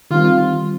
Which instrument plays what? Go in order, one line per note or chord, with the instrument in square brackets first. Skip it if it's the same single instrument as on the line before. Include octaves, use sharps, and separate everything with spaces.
[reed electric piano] D#3 G3 C4 [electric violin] F4